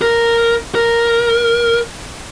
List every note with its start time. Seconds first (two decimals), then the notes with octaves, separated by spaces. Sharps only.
0.02 A#4
0.75 A#4